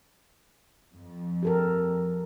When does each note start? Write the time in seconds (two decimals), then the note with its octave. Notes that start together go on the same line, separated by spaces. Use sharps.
0.96 F2
1.43 G4 A4 A#4